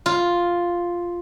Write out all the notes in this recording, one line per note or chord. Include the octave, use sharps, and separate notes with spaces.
F4